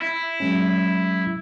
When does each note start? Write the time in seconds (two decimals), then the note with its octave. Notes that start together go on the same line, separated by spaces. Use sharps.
0.02 E4
0.40 F#3 G#3 C#4